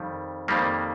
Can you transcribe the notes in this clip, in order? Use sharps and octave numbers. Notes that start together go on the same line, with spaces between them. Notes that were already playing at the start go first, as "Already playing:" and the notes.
Already playing: F2 D#3 G3
F2 D#3 G3 A#3